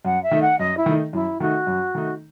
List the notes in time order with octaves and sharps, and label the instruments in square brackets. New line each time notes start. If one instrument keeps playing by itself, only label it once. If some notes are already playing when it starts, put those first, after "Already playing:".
[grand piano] F#2 [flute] F#5
[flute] E5
[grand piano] D#3 A3 D#4
[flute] F#5
[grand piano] F#2 [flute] D#5
[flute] E4
[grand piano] D#3 A3 D#4
[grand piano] F#2 [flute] E4
[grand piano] D#3 A3 D#4 [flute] F#4
[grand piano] F#2
D#3 A3 D#4